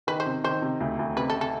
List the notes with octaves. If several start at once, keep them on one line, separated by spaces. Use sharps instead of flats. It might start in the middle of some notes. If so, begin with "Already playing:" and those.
D#3 B4
C5
C3
D#3 C5
C3
D2
D2
C3 B4
A4
C3
A4